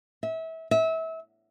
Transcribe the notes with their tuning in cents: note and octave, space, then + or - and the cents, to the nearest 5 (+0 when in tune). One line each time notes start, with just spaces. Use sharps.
E5 -30
E5 -30